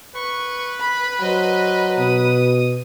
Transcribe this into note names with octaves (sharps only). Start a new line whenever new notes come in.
B4 C#6
B5
F#3 C5 D#5
B2 D#6